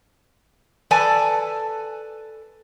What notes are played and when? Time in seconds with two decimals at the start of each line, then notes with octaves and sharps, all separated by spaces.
0.91 A4 B4 D5 G#5 A5